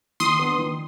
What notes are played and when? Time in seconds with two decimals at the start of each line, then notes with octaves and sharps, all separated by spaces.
0.20 D#3 C6 D#6
0.39 B3 D4
0.58 D#3